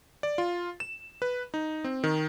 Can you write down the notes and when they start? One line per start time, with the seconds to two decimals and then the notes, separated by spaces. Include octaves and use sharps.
0.23 D5
0.38 F4
0.80 E7
1.22 B4
1.54 D#4
1.84 C4
2.04 D#3